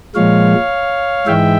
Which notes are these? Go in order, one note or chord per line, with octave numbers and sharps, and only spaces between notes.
A#2 F3 G#3 C#5 F5
G#2 E3 G#3 E5 G5